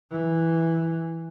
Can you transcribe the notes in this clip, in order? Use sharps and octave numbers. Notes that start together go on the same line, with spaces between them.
E3